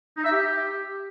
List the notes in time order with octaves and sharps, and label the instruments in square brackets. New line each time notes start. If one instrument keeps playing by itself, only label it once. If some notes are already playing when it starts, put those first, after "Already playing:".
[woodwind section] D#4
E5
G4